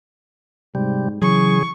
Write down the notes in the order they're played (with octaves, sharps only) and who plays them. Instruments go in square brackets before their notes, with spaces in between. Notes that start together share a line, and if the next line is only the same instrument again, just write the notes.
[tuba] G#2 [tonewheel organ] C3 G3
[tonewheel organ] C#3 G#4 [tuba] E3 [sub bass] F#3 [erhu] C#6